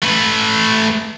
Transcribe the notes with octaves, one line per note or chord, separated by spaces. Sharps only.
A3 B4